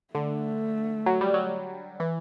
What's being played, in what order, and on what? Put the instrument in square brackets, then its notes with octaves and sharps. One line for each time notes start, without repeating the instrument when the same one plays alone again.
[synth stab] D3 [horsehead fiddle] A3
[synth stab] F#3
G3
F#3
E3